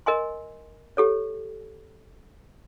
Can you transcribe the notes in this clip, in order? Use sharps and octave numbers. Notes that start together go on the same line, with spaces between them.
A#4 D#5 G#5 C6
G4 A4 C#5